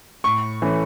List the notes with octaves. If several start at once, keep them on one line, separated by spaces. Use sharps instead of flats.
A2 C#6
E3 A3 C#4